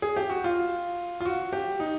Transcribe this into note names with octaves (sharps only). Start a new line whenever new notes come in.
G#4
G4
F#4
F4
F4
F#4
G4
D#4